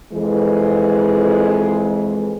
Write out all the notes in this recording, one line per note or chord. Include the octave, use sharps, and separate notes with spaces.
F2 E3 G#3